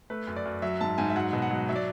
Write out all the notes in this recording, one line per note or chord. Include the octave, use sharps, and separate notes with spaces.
A3 B4
F#2
D5
F#2
F#3 E5
G#2 A5
G#2 G#5
E5
F#3 F#5
B2
F#5
F#3
F#3 E5
D5